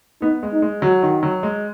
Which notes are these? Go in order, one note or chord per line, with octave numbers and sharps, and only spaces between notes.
B3 D#4
G#3
D#4
G#3
F#3 F#4
D#3
F#3
G#3